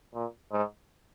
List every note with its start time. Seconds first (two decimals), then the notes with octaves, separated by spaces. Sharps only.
0.14 A#2
0.51 G#2